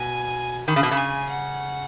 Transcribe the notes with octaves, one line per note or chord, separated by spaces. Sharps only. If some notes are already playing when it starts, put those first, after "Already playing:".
Already playing: B2 G#5
D#3 B5
C#3
B2
C#3
G#5
F#5